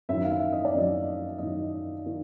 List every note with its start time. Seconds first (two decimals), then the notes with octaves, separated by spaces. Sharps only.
0.09 F#2 D#3 E5
0.24 F5
0.31 E5
0.52 D#5
0.65 D5
0.74 F#2 D#3 D#5
1.38 F#2 D#3 D#5
2.06 D#3